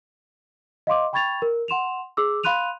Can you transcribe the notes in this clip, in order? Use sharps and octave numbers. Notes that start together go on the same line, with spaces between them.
D#5 F5 C6 D6
G5 B5 C#6 G#6 A6 F7
A#4
F#5 C6 E7 F7
G#4 D6 E6
F5 B5 C6 F#6 D#7 F7